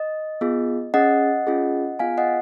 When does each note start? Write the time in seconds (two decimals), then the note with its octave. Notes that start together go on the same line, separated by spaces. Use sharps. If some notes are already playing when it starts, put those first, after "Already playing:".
Already playing: D#5
0.41 B3 F4 G#4
0.94 C#4 G#4 D#5 F#5
1.47 C#4 F4 G#4
1.99 B3 F4 G#4 F5 G#5
2.18 D#5 F#5